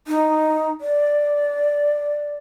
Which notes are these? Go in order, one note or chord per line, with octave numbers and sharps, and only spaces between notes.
D#4
D5